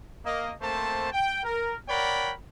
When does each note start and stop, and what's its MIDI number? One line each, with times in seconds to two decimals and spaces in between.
0.25 0.52 58
0.25 0.52 75
0.61 1.09 57
0.61 1.09 58
0.61 1.09 60
0.61 1.09 72
0.61 1.09 81
1.12 1.41 79
1.43 1.75 70
1.89 2.31 70
1.89 2.31 73
1.89 2.31 74
1.89 2.31 78
1.89 2.31 79
1.89 2.31 83